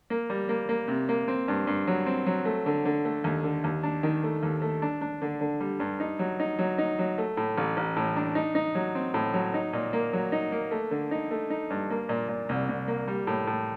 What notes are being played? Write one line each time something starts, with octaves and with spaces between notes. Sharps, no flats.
A#3
G3
A#3
A#3
C3
A#3
C4
G2
G2
F#3
C4
F#3
A3
D3
D3
A3
D#2
D3
D#2
D4
D#3
A3
D#2
A3
D4
D4
D3
D3
G3
G2
D#4
F#3
D#4
F#3
D#4
F#3
A3
A2
A1
A1
A2
D4
D#4
D#4
F#3
C4
A2
F#3
D#4
A#2
A#3
F#3
D#4
A#3
A3
D3
D#4
A3
D#4
G2
A#3
A#2
A#2
C2
C2
A#3
G3
A2
A2